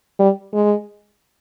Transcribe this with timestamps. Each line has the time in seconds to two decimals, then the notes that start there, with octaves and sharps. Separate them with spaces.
0.19 G3
0.53 G#3